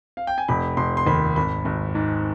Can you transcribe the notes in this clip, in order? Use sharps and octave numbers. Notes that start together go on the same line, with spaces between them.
F5
G5
G#5
F1 B5
F1 C6
C6
D#2 B5
G#1 B5
G#1
G#2